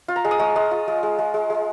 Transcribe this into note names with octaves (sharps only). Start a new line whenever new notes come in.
F4
A#5
G#3
D#6
G#3 C#6
G#3 D#6
F4
G#3
G#3
G#3
G#3
G#3